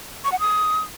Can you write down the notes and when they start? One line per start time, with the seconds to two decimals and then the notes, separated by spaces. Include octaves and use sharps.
0.24 C#6
0.32 F#5
0.39 D#6